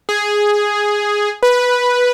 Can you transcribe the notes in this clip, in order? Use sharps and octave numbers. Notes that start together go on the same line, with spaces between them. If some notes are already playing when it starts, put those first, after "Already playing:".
G#4
B4